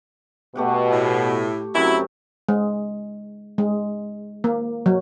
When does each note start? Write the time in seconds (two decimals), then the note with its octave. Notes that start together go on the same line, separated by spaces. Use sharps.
0.55 B2 A3 G4 F#5
0.90 A2
1.75 F#2 C3 E4 F#4
2.49 G#3
3.58 G#3
4.44 A#3
4.86 F#3